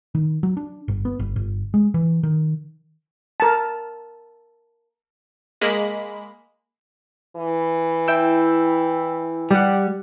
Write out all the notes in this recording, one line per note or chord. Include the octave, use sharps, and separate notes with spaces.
D#3
F#3
D4
G1
B3
G1
G1
G#3
E3
D#3
A#4 A5
G#3 A#3 B5
E3
E4 G5 E6
G3 G4 F#5